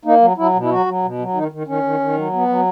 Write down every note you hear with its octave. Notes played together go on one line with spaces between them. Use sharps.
A#3 D#4
F#3
F#3 E4
B2
E4
F#3 F#4
F#3
B2
F#3
D#3 D#4
D#3
D#3 C#4
D#3
D#3
F#3
B3
F#3